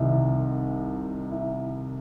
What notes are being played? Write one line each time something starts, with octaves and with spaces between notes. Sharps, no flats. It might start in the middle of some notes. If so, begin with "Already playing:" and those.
Already playing: C2 C3 D#3 D#4 E4
E4